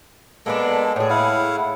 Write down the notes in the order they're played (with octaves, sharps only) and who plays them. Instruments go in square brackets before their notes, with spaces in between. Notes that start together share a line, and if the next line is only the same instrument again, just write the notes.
[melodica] G#3 A4 [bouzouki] A#3 B3 D4
[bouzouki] A2 G#4
[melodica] E4 F5 F#5